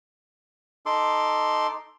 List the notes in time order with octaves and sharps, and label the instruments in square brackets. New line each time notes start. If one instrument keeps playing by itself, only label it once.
[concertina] D#4 A4 C6 D6